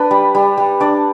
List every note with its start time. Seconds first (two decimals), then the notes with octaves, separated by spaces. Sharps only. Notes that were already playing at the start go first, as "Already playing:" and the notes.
Already playing: D4 B4 G5 B5
0.11 G3
0.35 G3
0.57 G3
0.80 D4 D5